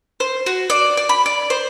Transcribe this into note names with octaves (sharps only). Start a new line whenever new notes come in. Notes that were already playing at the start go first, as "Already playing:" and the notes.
C5
F#4
D5
D5
B5
D5
C5